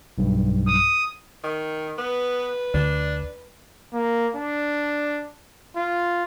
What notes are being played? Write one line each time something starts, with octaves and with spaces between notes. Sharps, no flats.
B1 G2
D#6
D#3
B3 B4
D2 D4
A#3
D4
F4